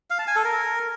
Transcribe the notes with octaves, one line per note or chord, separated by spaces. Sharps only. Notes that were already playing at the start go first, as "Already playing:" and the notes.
F5
A5
G#5
A4
A#4